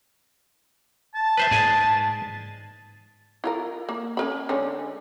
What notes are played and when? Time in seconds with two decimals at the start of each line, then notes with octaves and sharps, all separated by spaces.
1.15 A5
1.37 B4 C5 E5
1.51 G#2 G#4 D5 G#5
3.44 E4 F4 A#4
3.89 A#3
4.17 C#4 A#4 B5
4.49 D3 G#3 C#4